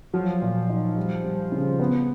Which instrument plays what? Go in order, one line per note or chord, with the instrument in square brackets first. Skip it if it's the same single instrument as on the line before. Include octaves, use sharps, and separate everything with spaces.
[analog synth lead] F3 [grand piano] F#3
[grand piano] A#2
D#4
G3
G3
C#3
B3